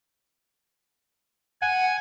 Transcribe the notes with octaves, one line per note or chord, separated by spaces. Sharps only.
F#5 G#5